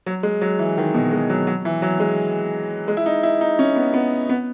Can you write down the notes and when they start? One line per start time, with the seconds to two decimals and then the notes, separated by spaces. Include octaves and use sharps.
0.06 F#3
0.23 G#3
0.42 F#3
0.59 E3
0.77 D#3
0.94 B2
1.12 G#3
1.30 F#3
1.47 F#3
1.65 E3
1.82 F#3
2.00 G#3
2.88 G#3
2.97 E4
3.06 D#4
3.23 E4
3.41 D#4
3.59 C#4
3.76 B3
3.94 B3
4.29 B3